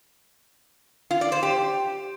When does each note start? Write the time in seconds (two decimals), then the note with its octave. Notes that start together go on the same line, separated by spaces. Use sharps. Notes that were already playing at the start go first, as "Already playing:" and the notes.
1.11 F4
1.21 D5
1.32 C5
1.43 G4